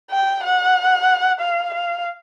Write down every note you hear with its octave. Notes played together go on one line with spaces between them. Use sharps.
G5
F#5
F5
F5